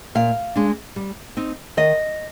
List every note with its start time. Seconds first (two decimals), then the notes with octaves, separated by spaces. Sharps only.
0.15 A#2 F5
0.56 G#3 D4
0.96 G3
1.37 C4 D#4
1.77 D#3 D#5